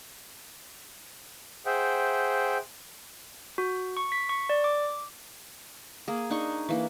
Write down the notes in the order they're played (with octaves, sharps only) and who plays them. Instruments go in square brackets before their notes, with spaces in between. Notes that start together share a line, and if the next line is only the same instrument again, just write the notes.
[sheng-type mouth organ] G#4 C5 E5 F#5 G5
[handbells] F#4
C#6
B6
C#6
D5
D6
[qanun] A#3 G#4
D4 D#4 G#4 C#6
E3 A#3